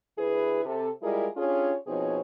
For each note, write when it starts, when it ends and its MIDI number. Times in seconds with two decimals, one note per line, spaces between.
0.18 0.62 38
0.18 0.62 64
0.18 0.62 68
0.18 0.62 71
0.65 0.89 48
0.65 0.89 69
1.02 1.27 55
1.02 1.27 56
1.02 1.27 64
1.02 1.27 65
1.02 1.27 68
1.02 1.27 70
1.37 1.74 61
1.37 1.74 62
1.37 1.74 65
1.37 1.74 67
1.37 1.74 68
1.37 1.74 73
1.87 2.20 47
1.87 2.20 53
1.87 2.20 60
1.87 2.20 63
1.87 2.20 68
1.87 2.20 73